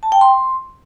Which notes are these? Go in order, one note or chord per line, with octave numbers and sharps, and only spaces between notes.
A5
G5
C6